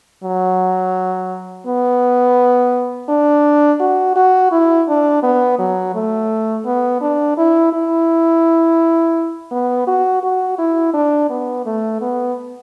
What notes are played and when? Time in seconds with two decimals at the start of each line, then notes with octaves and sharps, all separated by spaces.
0.24 F#3
1.67 B3
3.09 D4
3.80 F#4
4.16 F#4
4.51 E4
4.88 D4
5.23 B3
5.59 F#3
5.95 A3
6.65 B3
7.01 D4
7.37 E4
7.73 E4
9.52 B3
9.87 F#4
10.23 F#4
10.58 E4
10.94 D4
11.30 B3
11.66 A3
12.01 B3